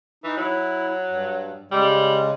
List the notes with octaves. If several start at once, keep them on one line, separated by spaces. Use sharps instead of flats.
E3 D#4
F#3 E4
G2
C#3 G3 G#3